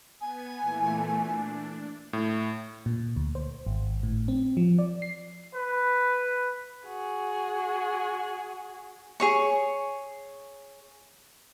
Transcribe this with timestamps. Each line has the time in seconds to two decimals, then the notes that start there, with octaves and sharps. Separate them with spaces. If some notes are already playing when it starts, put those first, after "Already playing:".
0.20 B3 G#5
0.61 A#2 E3 A3
1.18 D4
2.13 A2
2.86 A#2
3.16 D2
3.35 C5
3.66 G#1
4.03 A2
4.28 C4
4.57 F3
4.79 D5
5.02 C7
5.54 B4
6.86 F#4 G#4
9.20 G#4 C#5 C#6